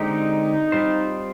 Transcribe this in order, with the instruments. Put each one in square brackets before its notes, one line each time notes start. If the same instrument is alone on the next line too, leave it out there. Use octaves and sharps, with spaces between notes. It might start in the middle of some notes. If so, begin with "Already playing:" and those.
Already playing: [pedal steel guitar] D3 G#3 C4 G4 [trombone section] D#4
[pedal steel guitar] G3 C4 F4 C5